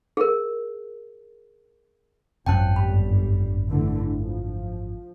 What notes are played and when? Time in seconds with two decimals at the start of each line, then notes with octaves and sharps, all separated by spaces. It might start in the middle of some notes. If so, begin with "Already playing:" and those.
0.17 G#4 A#4
2.46 G#1 F#2 F3 F#3 G5 A5 F#6
2.76 G1 G3 B5
3.68 D3 E3 A3
4.12 F3